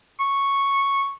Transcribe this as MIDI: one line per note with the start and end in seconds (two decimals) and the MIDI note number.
0.20 1.11 85